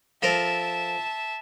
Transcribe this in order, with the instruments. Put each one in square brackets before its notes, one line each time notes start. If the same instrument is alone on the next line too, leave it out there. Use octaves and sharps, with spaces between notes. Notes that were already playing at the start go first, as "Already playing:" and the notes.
[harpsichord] F3 A4 A#4 [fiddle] E5 A5